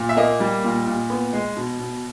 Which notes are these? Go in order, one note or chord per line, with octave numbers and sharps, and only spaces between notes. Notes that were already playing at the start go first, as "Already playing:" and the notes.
Already playing: A#2
E5
A#3 D#5
G3
A#2
A#2
B3
G#3
B2
B2